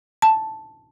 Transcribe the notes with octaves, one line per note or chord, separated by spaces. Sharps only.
A5